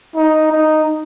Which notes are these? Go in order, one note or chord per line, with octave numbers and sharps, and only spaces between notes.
D#4
D#4